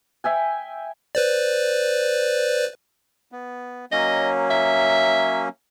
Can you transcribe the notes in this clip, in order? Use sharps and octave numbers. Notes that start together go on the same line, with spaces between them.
E5 G5 G#5
B4 C5 D5
B3
F#3 A#3 C#4 D#5
E5